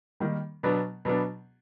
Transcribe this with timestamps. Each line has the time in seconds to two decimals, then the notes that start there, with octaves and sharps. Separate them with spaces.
0.20 D#3 G3 A#3
0.63 B2 F#3 B3 D4
1.05 B2 F#3 B3 D4